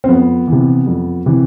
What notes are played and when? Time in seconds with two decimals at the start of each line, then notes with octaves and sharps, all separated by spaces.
0.04 C4
0.09 F2 B3
0.48 C3 E3
0.87 F2
1.26 C3 E3